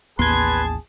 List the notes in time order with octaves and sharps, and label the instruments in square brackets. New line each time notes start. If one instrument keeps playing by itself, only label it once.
[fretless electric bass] A1 D#2 B3 [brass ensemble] G#4 A5 [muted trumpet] B4 [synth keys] C6 G#6